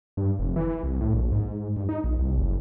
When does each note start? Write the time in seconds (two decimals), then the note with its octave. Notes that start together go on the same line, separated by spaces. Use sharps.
0.17 G2
0.39 F1
0.56 E3
0.83 C2
1.01 A2
1.14 A#1
1.32 G#2
1.76 G2
1.89 D#4
2.04 A#1
2.19 C2
2.38 F#1